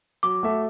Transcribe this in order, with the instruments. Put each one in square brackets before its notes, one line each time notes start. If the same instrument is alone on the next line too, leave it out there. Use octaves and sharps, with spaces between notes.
[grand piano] F#3 [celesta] D6
[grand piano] A3 F#4 A4 E5